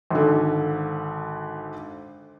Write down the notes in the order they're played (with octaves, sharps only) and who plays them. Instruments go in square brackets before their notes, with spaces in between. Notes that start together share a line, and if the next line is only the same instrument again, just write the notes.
[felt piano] G#1 D3